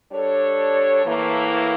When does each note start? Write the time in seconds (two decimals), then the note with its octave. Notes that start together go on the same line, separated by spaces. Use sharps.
0.12 G3 D4 A4 C#5
1.03 A2 E3 A#3